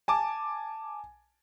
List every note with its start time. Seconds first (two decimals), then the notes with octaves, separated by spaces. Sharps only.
0.08 G#5 A5 D6